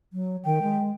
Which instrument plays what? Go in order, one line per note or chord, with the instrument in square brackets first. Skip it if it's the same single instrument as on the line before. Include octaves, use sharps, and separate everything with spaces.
[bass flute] F#3
[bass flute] D#3 [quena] G5
[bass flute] G#3